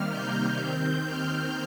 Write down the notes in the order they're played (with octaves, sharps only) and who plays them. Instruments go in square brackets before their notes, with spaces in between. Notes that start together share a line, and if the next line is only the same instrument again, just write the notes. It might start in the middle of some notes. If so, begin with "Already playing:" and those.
Already playing: [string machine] C3 D#3 G3 A#3 F6
G6
D#2 D#3 C4
F6